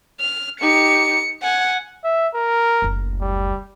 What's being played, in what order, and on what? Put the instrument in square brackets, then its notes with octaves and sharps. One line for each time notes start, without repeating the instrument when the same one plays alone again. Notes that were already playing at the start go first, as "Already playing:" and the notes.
[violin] F6
[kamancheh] D#4 G4 [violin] C#7
[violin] F#5 [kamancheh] G#5
[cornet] E5
A#4
[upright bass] F#1 D2
[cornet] G3